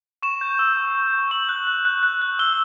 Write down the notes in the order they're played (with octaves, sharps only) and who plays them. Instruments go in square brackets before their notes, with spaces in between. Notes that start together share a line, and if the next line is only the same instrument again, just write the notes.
[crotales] C#6 E7
G6
E6
E6
C#6
G6
C#6 F#7
F#6
F#6
F#6
F#6
F#6
E6 G7